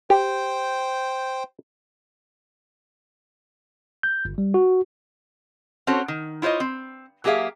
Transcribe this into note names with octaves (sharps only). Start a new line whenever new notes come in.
G4 C5 G5
G6
G1
G3
F#4
C4 C#4 F#4 A4 C5 C#5
D#3
E4 F4 C5 C#5 D#5
C4
F#3 A#3 G4 G#4 E5 F5